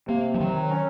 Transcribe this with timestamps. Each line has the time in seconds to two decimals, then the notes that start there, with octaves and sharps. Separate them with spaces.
0.08 C3 A#3
0.34 F3
0.39 D#3 F#3
0.71 C#4